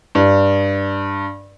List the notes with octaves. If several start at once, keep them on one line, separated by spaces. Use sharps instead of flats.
G2